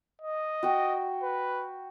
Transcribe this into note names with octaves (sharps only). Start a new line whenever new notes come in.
D#5
F#4 G5
B4